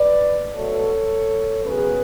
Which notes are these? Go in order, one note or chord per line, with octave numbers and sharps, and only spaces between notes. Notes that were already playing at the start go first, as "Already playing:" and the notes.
Already playing: B4 D5
B2 F#3 A3 A4 C#5
C#3 F#3 B3 G#4 B4